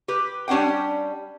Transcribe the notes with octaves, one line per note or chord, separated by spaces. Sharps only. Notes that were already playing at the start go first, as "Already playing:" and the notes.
G4 B4
G3 C#4 D4 F#5 G5